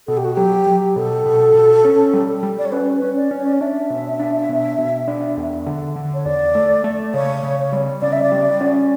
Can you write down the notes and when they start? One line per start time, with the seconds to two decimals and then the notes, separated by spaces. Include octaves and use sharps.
0.07 B2 A4
0.17 G4
0.25 F#4
0.34 F#3 G4
0.67 F#3
0.96 B2 A4
1.26 B2
1.55 B2
1.84 C#4
2.13 G3
2.43 G3
2.58 D5
2.65 C#5
2.72 C#4 B4
2.94 B4
3.02 C#4
3.16 D5
3.31 C#4
3.38 C#5
3.46 D5
3.53 C#5
3.61 D4 E5
3.90 B2
4.20 D4
4.49 B2
4.78 B2
5.08 D4
5.37 E2
5.66 D3
5.96 D3
6.14 C#5
6.25 E2 D5
6.55 A3
6.84 A3
7.14 C#3 C#5
7.43 C#3
7.72 G3
8.01 C#3 D5
8.13 E5
8.22 D5
8.32 G3
8.61 C#4